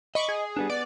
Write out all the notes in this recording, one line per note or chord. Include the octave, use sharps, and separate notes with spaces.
D#5 B5 C#6 D6
G#4
G3 B3 D4
B3 D5